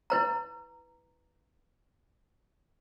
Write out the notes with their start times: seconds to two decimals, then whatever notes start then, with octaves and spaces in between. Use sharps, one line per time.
0.10 E4 B4 A#5